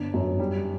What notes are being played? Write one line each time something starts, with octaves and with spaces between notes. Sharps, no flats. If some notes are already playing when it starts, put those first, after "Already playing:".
Already playing: G1 D4
F#2
G3